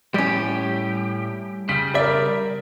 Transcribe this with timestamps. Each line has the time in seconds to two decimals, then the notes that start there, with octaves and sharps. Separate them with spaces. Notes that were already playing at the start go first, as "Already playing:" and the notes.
0.14 A2 G3 C#4 G4
1.69 C#3 G3 B6
1.95 A#4 D5 E5